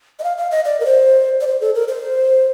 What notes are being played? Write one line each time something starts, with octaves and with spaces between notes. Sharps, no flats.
D#5
F5
F5
D#5
D5
A#4
C5
D5
C5
A4
A#4
C5